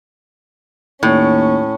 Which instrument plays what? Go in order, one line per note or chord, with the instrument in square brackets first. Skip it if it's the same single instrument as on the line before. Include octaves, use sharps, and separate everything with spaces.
[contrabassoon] D#2 [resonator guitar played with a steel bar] A2 [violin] C#4